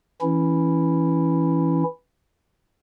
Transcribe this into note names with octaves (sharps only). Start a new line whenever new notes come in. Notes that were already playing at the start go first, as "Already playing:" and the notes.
E3 C#4 E4